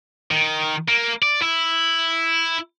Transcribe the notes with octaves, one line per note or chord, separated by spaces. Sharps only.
D#3
A#3
D5
E4